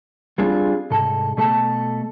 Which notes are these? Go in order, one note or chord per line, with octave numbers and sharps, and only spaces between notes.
G3 C4 D4 F4 G#4
C2 G#2 A4
B2 A3 A4